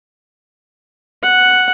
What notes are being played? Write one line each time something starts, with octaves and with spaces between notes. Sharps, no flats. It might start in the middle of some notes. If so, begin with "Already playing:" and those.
F#5